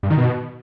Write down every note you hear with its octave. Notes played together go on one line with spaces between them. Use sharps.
G2
D#3
B2